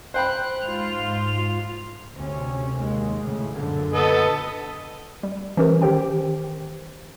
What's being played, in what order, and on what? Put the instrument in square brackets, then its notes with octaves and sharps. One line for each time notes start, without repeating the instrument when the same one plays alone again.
[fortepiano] C5 G5 B5 [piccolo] F#6
[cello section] G#2 F4 [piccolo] F7
[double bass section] D2 C3 C#4
D#2 G#3
A2 C#3
F#2 A#2 D3
[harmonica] B3 A4 D#5
[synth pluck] G3
E3 G3 C#4 G4 A#4 C5
D#3 G4 C5 G5